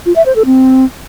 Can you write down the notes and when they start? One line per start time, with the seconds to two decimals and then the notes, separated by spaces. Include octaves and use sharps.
0.06 F4
0.16 E5
0.26 C5
0.36 A4
0.46 C4